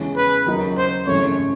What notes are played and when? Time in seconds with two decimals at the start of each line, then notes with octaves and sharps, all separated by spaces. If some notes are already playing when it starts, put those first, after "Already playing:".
Already playing: E2 C#3 E3 G#3 C#4
0.17 B4
0.47 D#2 C#3 F#3 A#3 D#4
0.77 C5
1.07 G#1 F#2 C#3 E3 A3 C#5